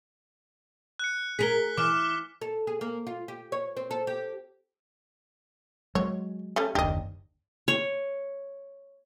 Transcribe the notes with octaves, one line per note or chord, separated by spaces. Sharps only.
F#6 C#7
G#4 A#4 B6 G7
E3 D6 F6 E7
A4
G#4
A#3
F4
G4
C#5
C4
A4
G4
F#3 G#3 C#5
G3 A3 C#4
F#1 D#2 D4 G4 D#5
C#5